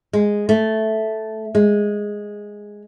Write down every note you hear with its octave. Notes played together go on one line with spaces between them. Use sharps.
G#3
A3
G#3